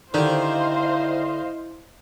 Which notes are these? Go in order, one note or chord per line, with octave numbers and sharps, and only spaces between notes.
D3 D#3 E4 G4 C5 D#5 F5